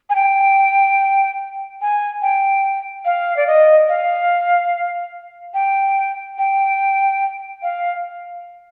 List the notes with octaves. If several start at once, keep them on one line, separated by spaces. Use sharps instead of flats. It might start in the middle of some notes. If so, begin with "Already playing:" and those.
G#5
G5
G#5
G5
F5
D5
D#5
F5
G5
G5
F5